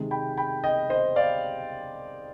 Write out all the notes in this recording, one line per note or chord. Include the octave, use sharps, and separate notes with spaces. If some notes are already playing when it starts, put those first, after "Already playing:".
Already playing: C3 D#3 G#3
G5 B5
G5 B5
D#5 G5
C5 D#5
D5 F5